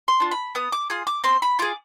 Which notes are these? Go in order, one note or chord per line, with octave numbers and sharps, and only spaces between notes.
C6
D4 F4
B5
B3 D#6
D6
F4 G#4 D#6
D6
C4 C6
B5
F4 G#4 D6